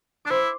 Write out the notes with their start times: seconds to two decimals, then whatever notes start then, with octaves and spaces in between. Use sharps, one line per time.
0.25 D4 D6
0.30 E4 C5 C6